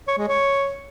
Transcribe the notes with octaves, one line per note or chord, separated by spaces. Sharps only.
C#5
G#3
C#5